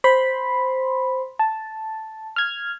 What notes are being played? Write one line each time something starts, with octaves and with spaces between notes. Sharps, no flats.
C5 B5 C6
A5
F6 G#6